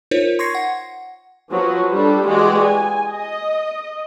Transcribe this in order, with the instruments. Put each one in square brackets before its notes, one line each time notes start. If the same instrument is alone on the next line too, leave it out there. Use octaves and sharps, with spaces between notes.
[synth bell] D#4 F4 A#4 C5 C#5
C6 C#6 G#6 A#6 C7 C#7
F#5
[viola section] F3 F#3 F#4 B4
G3 D4 A4
E3 G#3 F#4 G4 D5
G#5
D#5